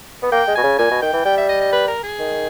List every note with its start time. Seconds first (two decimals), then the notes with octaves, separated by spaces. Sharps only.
0.23 B3
0.32 A#3 G5
0.48 G#3
0.55 B2 G#5
0.63 C#3
0.78 A#2 G#5
0.91 B2
1.02 D#3 G5
1.13 E3
1.25 G3 G5
1.38 E5
1.49 D#5
1.61 D#5
1.73 B4
1.88 A#4
2.04 G#4
2.19 D#3